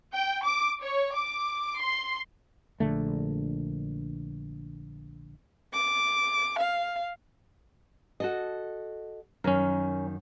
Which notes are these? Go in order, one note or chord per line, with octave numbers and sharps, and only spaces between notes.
G5
D6
C#5
D6
C6
A#1 D3 A3
D6
F5
F#4 A4 D#5
F#2 D#3 C#4 A#4